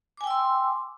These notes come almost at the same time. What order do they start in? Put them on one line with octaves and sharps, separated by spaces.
D6 G#5 G5 E6 C6